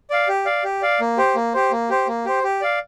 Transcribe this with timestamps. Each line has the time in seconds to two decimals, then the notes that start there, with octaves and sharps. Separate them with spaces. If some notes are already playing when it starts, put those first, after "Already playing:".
0.10 D5 F5
0.28 G4
0.46 D5 F5
0.64 G4
0.82 D5 F5
1.00 A#3
1.17 G4 C5
1.35 A#3
1.54 G4 C5
1.71 A#3
1.90 G4 C5
2.07 A#3
2.25 G4 C5
2.43 G4
2.61 D5 F5